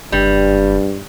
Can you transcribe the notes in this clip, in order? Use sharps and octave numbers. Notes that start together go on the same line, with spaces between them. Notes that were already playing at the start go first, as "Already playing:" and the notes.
F#1 G2 G3